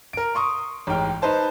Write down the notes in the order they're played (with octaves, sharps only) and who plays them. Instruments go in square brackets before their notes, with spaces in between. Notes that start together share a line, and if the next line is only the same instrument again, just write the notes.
[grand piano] A#4 D7
C6 C#6 D#6
A1 G#2 G5 F6
D#4 B4 C5 A5